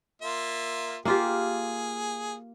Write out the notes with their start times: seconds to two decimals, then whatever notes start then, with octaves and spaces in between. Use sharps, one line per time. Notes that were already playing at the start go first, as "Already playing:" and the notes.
0.22 A#3 F4 E5
1.05 A#3 F4 G4 G#4